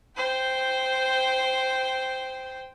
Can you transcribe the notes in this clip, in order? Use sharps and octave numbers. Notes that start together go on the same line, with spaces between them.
C5 G5